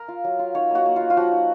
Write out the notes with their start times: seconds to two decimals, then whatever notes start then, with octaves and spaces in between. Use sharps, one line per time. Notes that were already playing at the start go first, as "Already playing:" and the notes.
Already playing: A#4
0.08 F4
0.24 F#3
0.39 F4
0.55 D#4 C#5
0.71 A#3 F#4
0.85 A#3
0.96 A#3 F4
1.10 F4
1.17 F3 F#4
1.32 D#4